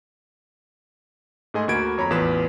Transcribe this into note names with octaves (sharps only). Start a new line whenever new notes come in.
G#2 A3 G#4 D#5 G#5 C6
D2 A#3 F#4 B5 G#6 D7
F2 C#5 A#5 B5
A1 E2 F4 B4 E7